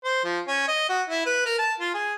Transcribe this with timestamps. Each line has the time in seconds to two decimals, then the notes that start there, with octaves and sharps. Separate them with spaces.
0.04 C5
0.25 F3
0.48 C#4
0.68 D#5
0.89 F#4
1.10 E4
1.26 B4
1.46 A#4
1.59 A5
1.80 F4
1.94 G#4